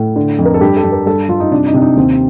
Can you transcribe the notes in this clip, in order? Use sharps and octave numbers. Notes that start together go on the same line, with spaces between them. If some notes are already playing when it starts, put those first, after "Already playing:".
Already playing: A2
D3
F2
A#4
A4
G2 G4
A4
G2
A#4
G2 A4
G2 F4
D#4
C3 D4
D#4
C3 D4
D#4
D#2 C4